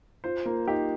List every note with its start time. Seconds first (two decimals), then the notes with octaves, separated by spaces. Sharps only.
0.24 F4 C5
0.46 A#3 F4
0.67 D#4 G4